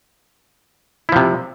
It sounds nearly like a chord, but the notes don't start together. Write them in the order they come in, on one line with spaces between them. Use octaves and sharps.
E4 F3 C3